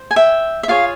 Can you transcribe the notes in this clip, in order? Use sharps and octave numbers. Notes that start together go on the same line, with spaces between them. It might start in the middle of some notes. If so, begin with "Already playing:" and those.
Already playing: C5
G#5
E5 G5
E5
F4 G#4 C#5 F5